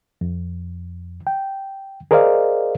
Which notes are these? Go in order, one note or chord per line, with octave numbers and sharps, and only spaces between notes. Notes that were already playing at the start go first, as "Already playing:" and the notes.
F2
G5
G#4 A#4 C5 D5 D#5 F5